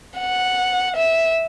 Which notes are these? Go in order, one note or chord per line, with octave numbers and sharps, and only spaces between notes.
F#5
E5